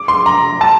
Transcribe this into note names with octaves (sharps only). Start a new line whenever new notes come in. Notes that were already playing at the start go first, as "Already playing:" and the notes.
Already playing: D6
C6
A#5
A5